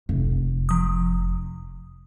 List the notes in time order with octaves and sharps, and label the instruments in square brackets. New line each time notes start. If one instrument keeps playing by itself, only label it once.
[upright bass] F1
[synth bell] F3 D#6